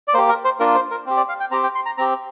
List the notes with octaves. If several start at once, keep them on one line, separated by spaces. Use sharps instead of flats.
D5
A#3 G4 C5
A#4
C5
A#3 D4 F4 A#4
C5
A#4
C4 G4
D5
F5
G5
C4 G4 A#5
G5
C6
A#5
C4 G4 A#5